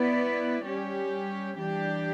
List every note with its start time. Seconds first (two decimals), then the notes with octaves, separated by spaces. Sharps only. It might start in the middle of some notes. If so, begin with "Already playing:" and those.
Already playing: B3 E4 B4 D5
0.63 G3 C#4 G4
1.57 E3 G3 D4 G4